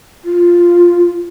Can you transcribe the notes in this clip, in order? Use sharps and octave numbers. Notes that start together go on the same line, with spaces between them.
F4